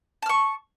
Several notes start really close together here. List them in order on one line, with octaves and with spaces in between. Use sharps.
A5 F6 C#6